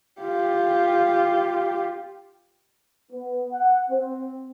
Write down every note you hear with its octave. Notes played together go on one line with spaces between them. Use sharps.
F4 G4
B3
F#5
C4